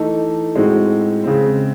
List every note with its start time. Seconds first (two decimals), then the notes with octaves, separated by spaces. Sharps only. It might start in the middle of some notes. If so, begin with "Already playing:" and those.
Already playing: E3 A3 D#4
0.56 A2 G#3 C4 D#4 F#4
1.24 C#3 G#3 C4